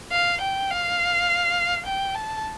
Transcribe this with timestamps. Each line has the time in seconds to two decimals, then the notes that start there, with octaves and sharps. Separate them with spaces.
0.12 F5
0.41 G5
0.70 F5
1.86 G5
2.15 A5